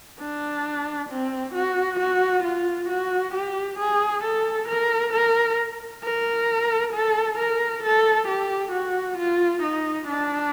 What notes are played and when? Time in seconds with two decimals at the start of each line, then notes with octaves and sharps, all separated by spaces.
0.20 D4
1.09 C4
1.54 F#4
1.99 F#4
2.44 F4
2.89 F#4
3.34 G4
3.79 G#4
4.24 A4
4.69 A#4
5.13 A#4
6.04 A#4
6.93 A4
7.39 A#4
7.83 A4
8.28 G4
8.72 F#4
9.18 F4
9.63 D#4
10.08 D4